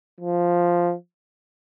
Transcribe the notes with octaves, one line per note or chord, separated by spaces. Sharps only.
F3